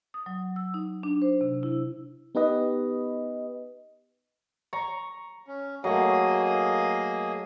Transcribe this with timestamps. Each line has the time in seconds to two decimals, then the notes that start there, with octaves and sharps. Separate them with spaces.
0.14 D#6
0.26 F#3
0.56 E6
0.74 D#4
1.03 D4
1.22 C5
1.41 C3
1.63 E4
2.35 B3 D#4 G4 B4 D#5
4.73 A#5 C#6
5.47 C#4
5.84 F#3 A3 A#3 G#4 D#5